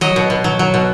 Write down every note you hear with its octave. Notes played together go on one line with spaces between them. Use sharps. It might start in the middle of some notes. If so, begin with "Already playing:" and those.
F#3 D#5
B2
B2
F#3
F#3
B2